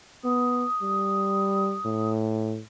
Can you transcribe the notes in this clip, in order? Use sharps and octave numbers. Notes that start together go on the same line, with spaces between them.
B3 D#6
G3
A2